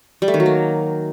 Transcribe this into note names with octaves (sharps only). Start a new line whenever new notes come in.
G3
A3
D#3
F#3
A#3